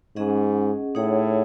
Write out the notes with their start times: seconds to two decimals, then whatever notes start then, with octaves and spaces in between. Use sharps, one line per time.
0.16 G#2 C#4 G#4 D#5 F#5
0.95 A2 D#4 G#4 C#5 F#5